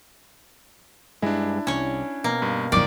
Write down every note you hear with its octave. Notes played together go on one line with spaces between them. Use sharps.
G2 G#3 D4 E4
C2 C#4 C#5
B2 A#3
G2
F#2 D#3 F3 D5 D6